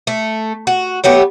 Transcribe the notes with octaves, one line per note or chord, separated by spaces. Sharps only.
A3
F#4
F#3 A3 B3 G4